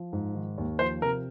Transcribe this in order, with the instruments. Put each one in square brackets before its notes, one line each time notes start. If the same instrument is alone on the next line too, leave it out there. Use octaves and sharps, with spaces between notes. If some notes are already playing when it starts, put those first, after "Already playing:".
Already playing: [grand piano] F3
G#2
D#3
D#2
F3 C5
C3 A#4